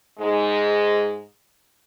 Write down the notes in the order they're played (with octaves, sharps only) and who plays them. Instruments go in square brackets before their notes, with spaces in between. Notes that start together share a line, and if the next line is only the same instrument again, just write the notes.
[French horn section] G#2 G#3